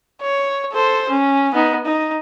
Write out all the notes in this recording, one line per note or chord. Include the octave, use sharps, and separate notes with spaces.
C#5
A4 C5
C#4
B3 D#4
D#4